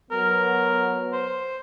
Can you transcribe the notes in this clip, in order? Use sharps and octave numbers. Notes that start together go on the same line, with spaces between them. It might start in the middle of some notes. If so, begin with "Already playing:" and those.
F#3 B3 A#4
C5